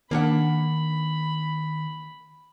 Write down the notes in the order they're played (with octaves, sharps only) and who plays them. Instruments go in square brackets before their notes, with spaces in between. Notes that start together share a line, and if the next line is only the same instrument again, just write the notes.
[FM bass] D#3 [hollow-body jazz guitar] A#3 D4 F#5 [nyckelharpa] B5